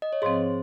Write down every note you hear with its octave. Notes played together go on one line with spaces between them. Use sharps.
D#5
C#5
G#2 F3 C4 G#4 C5